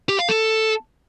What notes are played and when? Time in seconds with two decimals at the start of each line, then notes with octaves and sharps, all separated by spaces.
0.09 G4
0.19 F5
0.29 A4